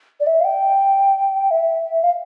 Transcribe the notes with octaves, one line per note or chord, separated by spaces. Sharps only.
D5
E5
F5
G5
E5
F5